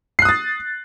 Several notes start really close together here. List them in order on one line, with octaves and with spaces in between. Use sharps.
C7 F#6 D#6 A6